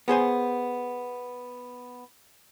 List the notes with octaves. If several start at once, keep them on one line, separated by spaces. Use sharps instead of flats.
B3 G#4 C5 G#5